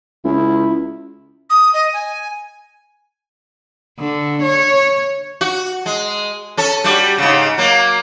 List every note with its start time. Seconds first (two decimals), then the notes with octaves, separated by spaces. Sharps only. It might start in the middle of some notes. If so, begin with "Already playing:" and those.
0.24 C#2 E4
1.50 D#6
1.74 D#5
1.93 G#5
3.99 D3
4.42 C#5
5.41 F#4
5.86 G#3
6.57 C#4 A4
6.84 G3 F#4 G4
7.18 G#2 C#3
7.58 F#3 A#3